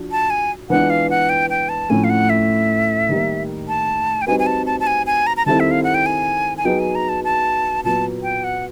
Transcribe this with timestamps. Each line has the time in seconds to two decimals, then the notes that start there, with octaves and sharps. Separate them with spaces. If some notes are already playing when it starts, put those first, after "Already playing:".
Already playing: F3 D4 F#4
0.12 A5
0.30 G#5
0.70 E3 G#3 B3 D4 F4 F#5
0.90 F5
1.10 F#5
1.29 G5
1.50 G5
1.69 A5
1.90 A2 F3 A3 C#4 G#5
2.04 F5
2.10 F#5
2.30 E5
3.09 D#3 G3 A#3
3.68 A5
4.22 G5
4.27 G3 C4 D#4 F#4 B4 G#5
4.39 G#5
4.46 A5
4.66 A5
4.80 A5
4.87 G#5
5.06 G#5
5.27 A#5
5.37 A#5
5.46 D#3 G3 C4 E4 A4 A5
5.60 E5
5.71 F5
5.84 F#5
5.94 G5
6.06 G#5
6.58 G#5
6.65 F#3 B3 D#4 G#4 B4 G5
6.79 G#5
6.95 A#5
7.09 A5
7.24 A5
7.84 A#2 F#3 B3 A5
8.23 G5
8.44 F#5